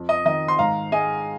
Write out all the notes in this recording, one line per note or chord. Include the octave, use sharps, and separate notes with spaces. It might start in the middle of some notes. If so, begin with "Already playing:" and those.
Already playing: F2
D#5
D#3 D#5
C6
G#2 F5 A#5
G#3 D#5 G#5